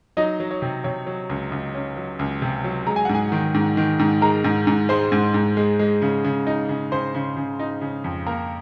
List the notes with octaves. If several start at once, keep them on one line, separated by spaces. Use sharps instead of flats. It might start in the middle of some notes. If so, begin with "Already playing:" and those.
F#3 D#4 D#5
F#3
C#5
C3
C3 C#5
F#3
C#2
C#2
C#4
F#3
C#2
C3
F#3
G#3 A#5
G#5
G#2 F#5
G#4 G#5
D#3
G#2
D#3
G#2
G#3 A#4 A#5
G#2
G#2
G#3 C5 C6
G#2
G#2
G#3
G#3
C#3
C#3
D#4
C#3
C#3 C5 C6
C#3
C#3
D#4
C#3
F2
A#3 A#4 A#5